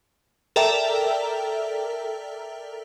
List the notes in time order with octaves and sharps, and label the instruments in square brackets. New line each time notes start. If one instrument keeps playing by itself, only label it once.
[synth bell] A4 A#4 D5 E5 G5 A#5